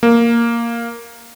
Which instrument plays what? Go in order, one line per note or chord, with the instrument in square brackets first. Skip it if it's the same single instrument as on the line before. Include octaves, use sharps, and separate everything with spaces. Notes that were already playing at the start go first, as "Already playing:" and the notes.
[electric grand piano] A#3